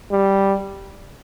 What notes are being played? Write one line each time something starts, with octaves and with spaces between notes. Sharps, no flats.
G3